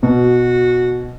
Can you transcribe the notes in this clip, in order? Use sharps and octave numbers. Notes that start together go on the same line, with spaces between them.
B2 F#4